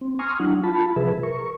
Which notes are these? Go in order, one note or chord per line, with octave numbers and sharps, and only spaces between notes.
C4
G#5 A#5 C6 C#6 D#6 F6
F#3 D4 E4 F#5
F4 A5 B5
C3 F3 G#4 B4 E5
A#4 C#6